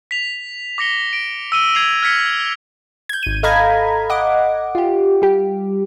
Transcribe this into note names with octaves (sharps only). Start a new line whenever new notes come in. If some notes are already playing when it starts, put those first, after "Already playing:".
B6 F7
D6 A#6 C#7 G7
D7
E6 D#7 G7
G#6 C7 F7
F6 G#6 B6 C#7
G6 G#6
G#1 D#7
A4 D#5 F5 A#5 B5 G#6
D#5 F#5 D6
F4 G4
G3 G4